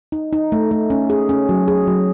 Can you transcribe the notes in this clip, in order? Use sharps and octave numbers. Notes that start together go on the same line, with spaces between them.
D#4
D#4
A3
A3
C#4
G#4
C#4
F#3
G#4
F#3